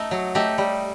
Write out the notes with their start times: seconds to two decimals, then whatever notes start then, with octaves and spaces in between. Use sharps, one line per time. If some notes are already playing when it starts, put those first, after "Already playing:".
Already playing: A3 D#4
0.11 F#3
0.35 A3 D#4 G4
0.58 G3